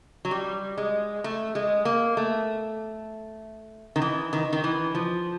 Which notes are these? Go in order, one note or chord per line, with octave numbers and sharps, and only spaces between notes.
F#3
G3
G#3
A3
G#3
A#3
A3
D#3
E3
D#3
D#3
E3
F3